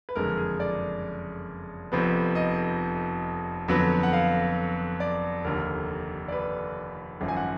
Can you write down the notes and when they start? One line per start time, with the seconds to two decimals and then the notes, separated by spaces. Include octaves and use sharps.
0.09 B4
0.15 F#1 F2 D3 G#3 A#4
0.37 G#4
0.60 D5
1.92 F1 F2 F3 B3
2.35 D#5
3.68 F2 D3 F#3 B3
4.03 F#5
4.13 F5
5.00 D5
5.45 F1 D#2 D3 A#4
6.28 D5
6.32 B4
7.21 G#1 F#2 F3
7.28 G#5
7.37 F#5